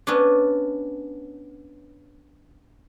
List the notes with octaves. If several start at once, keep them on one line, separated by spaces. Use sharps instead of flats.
B3 C#4 D4